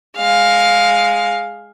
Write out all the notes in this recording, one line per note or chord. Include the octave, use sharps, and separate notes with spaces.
G#3 F5